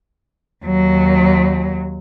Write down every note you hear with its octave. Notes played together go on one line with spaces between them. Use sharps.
D#2 F#3